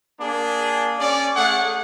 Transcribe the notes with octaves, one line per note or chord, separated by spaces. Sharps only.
A#3 D4 G#4
C#4 D5
A3 G#4 F#5